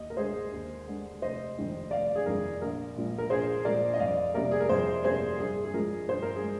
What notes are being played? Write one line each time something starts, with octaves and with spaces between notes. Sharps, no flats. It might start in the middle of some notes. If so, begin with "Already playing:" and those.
Already playing: D#2 D#5
A#4
D3 G#3 G#4 C5
D#2
D3 G#3
F1 C5 D#5
F2 D#3 G#3
F1 D5 F5
G#4
F2 D#3 G#3 A#4
A#1 A#4
A#2 F3 G#3
A#4
A#1 G#4 C5
A#2 F3 G#3 A#4 D5
D#5
F2 D5 F5
C3 G3 A#3 A#4 D5
G#4
A#4
F2 G#4 C5
C3 G3 A#3 G#4 C5
G2 G#4
G#4
F3 G#3 A#4
G2 C5
A#4
G#4
G#3